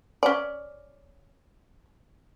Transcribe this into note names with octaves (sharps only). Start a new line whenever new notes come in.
C#4 D5